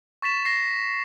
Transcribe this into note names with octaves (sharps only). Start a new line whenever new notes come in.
C#6 A6 B6 E7
A#6 C7